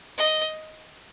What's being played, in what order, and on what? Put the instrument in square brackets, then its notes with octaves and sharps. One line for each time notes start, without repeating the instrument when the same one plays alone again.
[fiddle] D#5